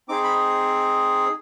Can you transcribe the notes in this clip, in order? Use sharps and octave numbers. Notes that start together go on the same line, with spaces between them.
C4 D#4 G#4 D6
B5